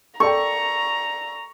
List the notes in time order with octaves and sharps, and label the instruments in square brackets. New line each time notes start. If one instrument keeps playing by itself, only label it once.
[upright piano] A4 D5 G5 [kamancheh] A#5 [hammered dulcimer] C#6